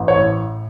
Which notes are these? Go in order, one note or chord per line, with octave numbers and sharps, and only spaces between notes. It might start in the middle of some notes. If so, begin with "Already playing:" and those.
Already playing: A1
C#5
A2